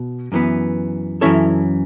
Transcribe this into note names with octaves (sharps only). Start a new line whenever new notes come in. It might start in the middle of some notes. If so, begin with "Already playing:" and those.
Already playing: B2
F#2 E3 B3
F#2 E3 C#4 E4 A4 C#5